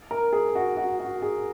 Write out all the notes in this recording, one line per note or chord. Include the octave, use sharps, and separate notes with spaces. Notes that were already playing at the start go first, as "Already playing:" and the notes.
A#4
G#4
F#4
F#4
F#4
G#4